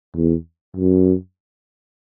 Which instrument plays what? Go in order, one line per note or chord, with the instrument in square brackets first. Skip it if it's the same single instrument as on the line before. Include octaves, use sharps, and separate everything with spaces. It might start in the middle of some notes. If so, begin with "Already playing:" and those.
[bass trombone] E2
F#2